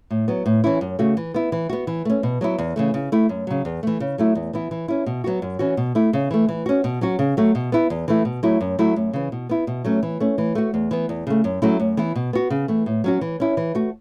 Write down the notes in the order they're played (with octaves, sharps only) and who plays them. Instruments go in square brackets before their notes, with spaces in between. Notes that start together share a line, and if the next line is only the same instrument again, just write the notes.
[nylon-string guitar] A2
F#3 B3
A2
E3 C#4 E4
F#2
C#3 A3 F#4
E3
B3 E4
E3
B3 F#4
E3
A3 C#4
B2
F#3 B3 E4
E2
C#3 E3 A3
C#3
A3 E4
F#2
C#3 F#3
E2
E3 A3
C#3
F#3 A3 E4
E2
E3 B3 E4
E3
C#4 E4
B2
F#3 B3 F#4
F#2
E3 C#4 F#4
B2
A3 E4
C#3
E3 A3
E3
C#4 F#4
B2
F#3 C#4 F#4
C#3
F#3 A3 F#4
B2
B3 E4
E2
E3 A3 E4
B2
F#3 A3 E4
F#2
F#3 A3 E4
F#2
C#3 E3
B2
B3 E4
B2
F#3 A3 C#4
E3
A3 C#4
E3
A3 F#4
E2
E3 B3
E2
C#3 A3
F#2
F#3 A3 C#4 E4
F#2
E3 B3 E4
B2
B3 F#4
C#3
E3 A3
A2
F#3 C#4 F#4
E3
C#4 E4
E3
A3 F#4